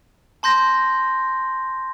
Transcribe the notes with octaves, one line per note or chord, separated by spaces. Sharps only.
A5 C6 G6 A#6